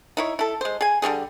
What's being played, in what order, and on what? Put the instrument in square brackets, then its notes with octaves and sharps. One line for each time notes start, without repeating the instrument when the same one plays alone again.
[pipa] D#4 E4 C#5
E4 A4
G#3 C5
G#4 G#5
D3 G3 C#4 G#4